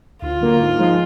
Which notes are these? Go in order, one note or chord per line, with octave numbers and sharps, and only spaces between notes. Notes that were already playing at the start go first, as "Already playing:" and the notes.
D2 F4
D3 F#3 A#3
G#2
F3 G#3 D#4